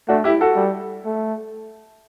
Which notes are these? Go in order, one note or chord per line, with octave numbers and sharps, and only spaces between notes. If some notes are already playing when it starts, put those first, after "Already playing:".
A3 D4 F#4
E4 G4
F#4 A4
G3
A3